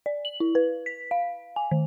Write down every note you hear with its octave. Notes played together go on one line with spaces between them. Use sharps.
D5
F#7
E4
B4
B6
F5
G#5
D#3